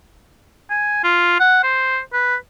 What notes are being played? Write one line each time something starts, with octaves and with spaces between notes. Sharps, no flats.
G#5
F4
F#5
C5
B4